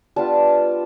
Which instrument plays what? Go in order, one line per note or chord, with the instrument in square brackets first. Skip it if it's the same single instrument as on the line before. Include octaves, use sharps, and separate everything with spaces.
[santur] G3 B3 D4 F4 A5